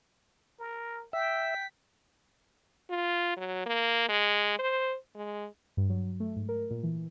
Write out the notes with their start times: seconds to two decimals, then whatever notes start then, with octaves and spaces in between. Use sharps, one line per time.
0.59 A#4
1.13 E5 G5 B6
2.90 F4
3.37 F#3
3.66 A#3
4.09 G#3
4.59 C5
5.15 G#3
5.77 G2
5.90 F#3
6.20 A3
6.36 G#2
6.49 A#4
6.71 A#2
6.83 E3